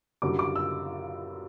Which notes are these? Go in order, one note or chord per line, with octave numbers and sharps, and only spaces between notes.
F#2 D3 G3 D6
D6
E6